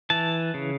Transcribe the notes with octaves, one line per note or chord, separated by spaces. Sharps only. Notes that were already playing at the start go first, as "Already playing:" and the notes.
E3 A5
C#3